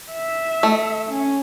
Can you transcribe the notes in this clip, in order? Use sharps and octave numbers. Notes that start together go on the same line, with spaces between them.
E5
A3
C#4